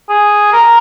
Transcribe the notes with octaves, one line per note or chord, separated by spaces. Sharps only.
G#4
A#4